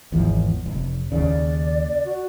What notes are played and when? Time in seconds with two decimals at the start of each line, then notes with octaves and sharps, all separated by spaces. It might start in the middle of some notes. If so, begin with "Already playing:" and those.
0.12 G#1 E2 F3
0.66 F1
1.12 D#2 C#3 D5
2.05 F#4